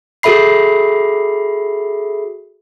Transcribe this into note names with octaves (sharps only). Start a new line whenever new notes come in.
F#4 G#4 A4 E5 B5 C7